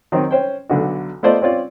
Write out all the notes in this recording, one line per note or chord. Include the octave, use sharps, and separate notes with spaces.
D#3 F#3 C4 D#4
C#4 C5 G5
B1 D3 F#4
A3 B3 F4 C5 D5 D#5
C4 C#4 F4 D5